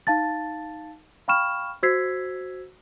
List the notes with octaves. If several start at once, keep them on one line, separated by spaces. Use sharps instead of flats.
D#4 F5 A5 A6
F5 G5 B5 C#6 F6 E7
F#4 C5 E6 G#6 B6 C7